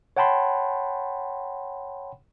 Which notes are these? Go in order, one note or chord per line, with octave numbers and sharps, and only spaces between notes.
C#5 F#5 G5 A5 B5 C6